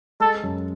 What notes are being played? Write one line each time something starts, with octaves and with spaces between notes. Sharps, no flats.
G#3 A4
F#2